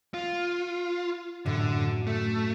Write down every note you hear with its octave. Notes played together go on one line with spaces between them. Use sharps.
F4
F#2 A2 D3 F#3
A3